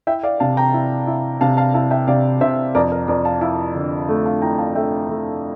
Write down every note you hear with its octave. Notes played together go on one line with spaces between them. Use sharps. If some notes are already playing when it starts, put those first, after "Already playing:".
E4 E5 G5
D5 F5
C3 F5 A5
G5 A#5
E4
E4
C3 F5 A5
F5 A5
E4 F5 A5
E5 G5
C3 D5 F5
C3 C5 E5
F2 A#4 D5
A#4
F2 A#4 D5
F5 A5
E4 F5 A5
D3
A3
F5 A5
E4 G5 A#5
F5 A5
A3 E5 G5
A3